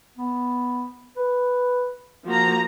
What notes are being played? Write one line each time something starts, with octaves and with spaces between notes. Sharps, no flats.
B3
B4
F3 A#3 F#4 A#5